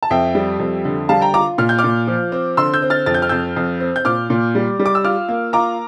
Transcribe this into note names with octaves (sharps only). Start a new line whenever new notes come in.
A5
F2 E5 G5
G3
F2
D3
G3 F5 A5
G5 A#5
F4 A#5 D6
A#2 F6
G6
D6 F6
A#2
F3
C4
D3 C6 E6
E6 G6
C4
F6 A6
F2 A6
G6
F6
F2 E6 G6
F2
C4
G6
A#2 D6 F6
A#2
G3
G3
D6
E6
F4 D6 F6
A#3
F4 A#5 D6